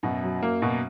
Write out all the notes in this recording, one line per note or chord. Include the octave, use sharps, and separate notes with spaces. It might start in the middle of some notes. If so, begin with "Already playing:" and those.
F#2 B2
F#3
A#3
B2